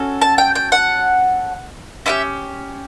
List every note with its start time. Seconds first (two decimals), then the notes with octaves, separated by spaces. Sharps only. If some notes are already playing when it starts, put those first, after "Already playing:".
Already playing: C#4 F#4 A4
0.21 A5
0.38 G5
0.55 G5
0.72 F#5
2.06 C#4 E4 G4 E5